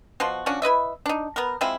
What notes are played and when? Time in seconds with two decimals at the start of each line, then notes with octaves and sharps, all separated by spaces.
0.20 B2 F3 F#4 C6
0.46 F3 C#4 D4 F#4
0.62 E4 B4 D#5 E5
1.06 D4 D#4
1.36 B3 A#4
1.61 F3 G#3 C4 E4